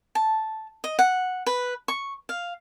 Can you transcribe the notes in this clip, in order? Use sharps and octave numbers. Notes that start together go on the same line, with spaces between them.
A5
D#5
F#5
B4
C#6
F5